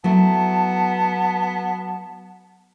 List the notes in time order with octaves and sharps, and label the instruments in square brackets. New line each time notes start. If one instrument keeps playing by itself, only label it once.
[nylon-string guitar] F#3 A3 E4 [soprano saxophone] B3 [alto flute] A5